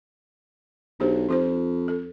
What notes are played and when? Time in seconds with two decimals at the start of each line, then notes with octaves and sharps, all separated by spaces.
1.00 B1 D4 G4 C5
1.29 F2 D#4 F4 C5
1.88 A4